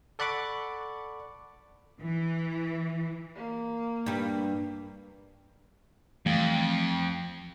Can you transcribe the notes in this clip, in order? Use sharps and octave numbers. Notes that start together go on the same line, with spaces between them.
A4 D5 F#5 B5 C#6 D6
E3
A#3
G2 G3
F2 E3 G3 A3